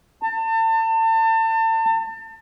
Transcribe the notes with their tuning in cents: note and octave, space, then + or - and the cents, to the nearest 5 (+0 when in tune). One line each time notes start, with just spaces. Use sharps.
A5 +35